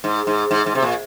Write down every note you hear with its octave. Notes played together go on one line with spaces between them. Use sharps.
G#2
G#2
G#2
G#2
C3
A#2